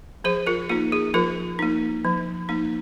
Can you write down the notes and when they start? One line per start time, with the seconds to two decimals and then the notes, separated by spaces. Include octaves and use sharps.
0.24 F3 G#4 C5
0.47 F4 A#4
0.69 A#3 D#4 F4
0.92 G#4
1.14 F3 F4 A#4
1.59 A#3 D#4
2.05 F3
2.49 A#3 D#4